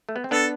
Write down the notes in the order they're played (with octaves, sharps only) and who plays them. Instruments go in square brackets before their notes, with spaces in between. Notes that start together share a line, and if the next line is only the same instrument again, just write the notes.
[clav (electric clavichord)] A3
B3
C4
[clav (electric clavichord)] B3 D4 [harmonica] A4